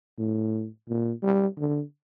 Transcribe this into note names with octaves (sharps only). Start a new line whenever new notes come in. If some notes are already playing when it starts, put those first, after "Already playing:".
A2
A#2
G3
D3